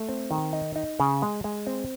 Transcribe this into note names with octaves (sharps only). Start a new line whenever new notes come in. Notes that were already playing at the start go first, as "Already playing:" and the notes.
Already playing: A3
C4
D#3
D#4
D#4
C#3
G#3
G#3
C4